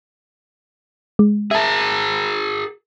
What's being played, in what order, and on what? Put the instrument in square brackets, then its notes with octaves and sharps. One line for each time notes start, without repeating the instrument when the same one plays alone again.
[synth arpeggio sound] G#3
[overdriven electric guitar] G#4 A#4 [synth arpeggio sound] E5 A5